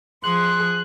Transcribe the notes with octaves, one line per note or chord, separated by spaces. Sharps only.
F3 G#4 C6 F#6